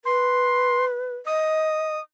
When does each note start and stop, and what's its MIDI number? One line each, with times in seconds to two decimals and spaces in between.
0.05 1.16 71
0.05 0.85 84
1.26 1.97 75
1.26 2.00 87